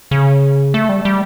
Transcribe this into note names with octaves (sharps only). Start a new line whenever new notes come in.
C#3
A3
G3
G3